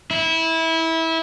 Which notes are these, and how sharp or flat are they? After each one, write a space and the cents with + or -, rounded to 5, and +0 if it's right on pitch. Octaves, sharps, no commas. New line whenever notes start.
E4 -20